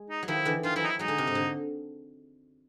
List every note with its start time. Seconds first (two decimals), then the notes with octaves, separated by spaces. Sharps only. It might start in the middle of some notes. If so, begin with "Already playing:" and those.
Already playing: G#3
0.10 D#4
0.23 F#3
0.28 D#3 F3 E4
0.45 D3 E3
0.63 D#3 F3 F4
0.76 E3 F#3 E4
0.84 D#4
0.87 E4
0.99 F#3 G#3 D#4
1.08 D3
1.18 C3
1.27 G#2
1.35 D3